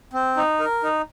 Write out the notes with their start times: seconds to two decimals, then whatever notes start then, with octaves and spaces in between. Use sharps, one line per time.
0.13 C4
0.37 D#4
0.60 A#4
0.83 D#4